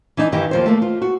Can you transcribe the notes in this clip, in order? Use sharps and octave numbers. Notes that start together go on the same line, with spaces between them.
E3 D4 D#4
G2 D#3 E3 G4
D#2 F3 C5
A3 A#3
F4
F#4